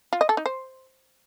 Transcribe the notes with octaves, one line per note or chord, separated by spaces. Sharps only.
F4
D#5
A4
D#4
C5